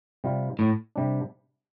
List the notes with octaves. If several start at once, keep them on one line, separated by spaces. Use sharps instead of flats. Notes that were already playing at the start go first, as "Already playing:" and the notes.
C3 G3 F4
A2
C3 G3 D4